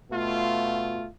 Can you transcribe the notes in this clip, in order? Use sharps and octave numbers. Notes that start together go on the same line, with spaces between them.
B2 A3 F4